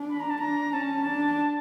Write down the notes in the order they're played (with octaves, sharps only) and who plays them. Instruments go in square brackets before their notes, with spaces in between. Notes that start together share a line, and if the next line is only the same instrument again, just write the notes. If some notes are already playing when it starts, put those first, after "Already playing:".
Already playing: [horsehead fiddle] D4
[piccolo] B5
A#5
A5
[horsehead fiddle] D4 [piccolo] A#5
[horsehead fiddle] C#4 [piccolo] A5
[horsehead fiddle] D4